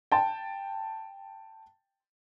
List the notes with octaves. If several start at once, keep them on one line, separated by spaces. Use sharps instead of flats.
G5 A5